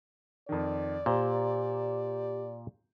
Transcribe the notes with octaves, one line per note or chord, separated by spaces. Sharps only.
F2 D#3 D5
A#2 G4 C5